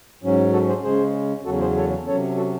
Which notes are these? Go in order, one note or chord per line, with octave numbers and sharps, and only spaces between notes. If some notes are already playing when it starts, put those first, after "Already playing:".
G#2 F#3 C#4
F#4 A4
G#4 C5
C#3 G#3 C#4 G#4 C5
E2 C#3 F#3 C#4 F#4 A4
G#4 C5
A4 C#5
C3 F#3 C#4 A4 C#5
F#4 A4